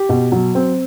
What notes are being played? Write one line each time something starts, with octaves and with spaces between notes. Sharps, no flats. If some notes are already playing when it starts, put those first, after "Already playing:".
Already playing: G4
B2
F#3
C4